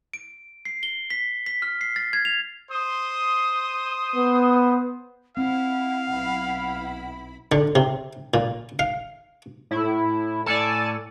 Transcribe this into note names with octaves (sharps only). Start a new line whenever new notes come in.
D7
C7
G7
B6
B6
F6
C7
A6
G#6
F7
C5 C6 D#6
B3
C4 E4 F5 F#5
B1 E4 B5
D3
C3
A#2
F5
A2 E4
A2 A4 D5 G#5 A5